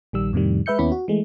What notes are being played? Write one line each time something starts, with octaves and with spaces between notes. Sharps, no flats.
A#1 D#3 G3 E6
F2 A2 C3 D#3 G3
G#3 B4 E5 G6 C#7
D#2 B3 C#4 E4 B5
F#4
E3 G#3 A3